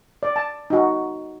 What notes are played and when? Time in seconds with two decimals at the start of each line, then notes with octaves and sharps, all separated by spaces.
0.23 D5
0.36 A5
0.70 D#4 F#4